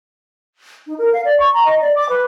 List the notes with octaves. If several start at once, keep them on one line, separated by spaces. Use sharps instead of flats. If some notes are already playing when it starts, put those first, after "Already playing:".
D#4
A#4
F5
D5
C#6
A#5
D#5
D5
D6
B4